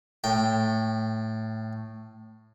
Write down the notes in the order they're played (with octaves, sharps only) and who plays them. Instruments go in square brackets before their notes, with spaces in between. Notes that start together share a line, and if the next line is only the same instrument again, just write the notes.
[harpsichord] A2 G5